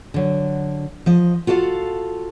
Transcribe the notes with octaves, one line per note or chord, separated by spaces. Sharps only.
D3 F#3
F3 D#5
F4 F#4 A4 D5 F5